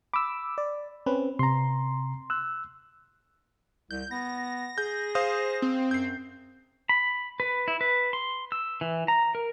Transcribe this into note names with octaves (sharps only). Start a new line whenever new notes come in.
B5 D6 E6
D5
C4 C#4 B4
C3 A#5 C6
E6 F#6
C2 G6
B3 A#6
G#4 G6
C5 F5 D#6
C4
F#2 G6 C7
B5
B4
E4
B4
C6
E6
E3
A#5
A#4